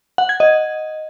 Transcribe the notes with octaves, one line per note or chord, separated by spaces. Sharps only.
F#5
G#6
D#5